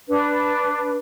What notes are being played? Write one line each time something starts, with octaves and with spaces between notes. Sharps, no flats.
D4 B4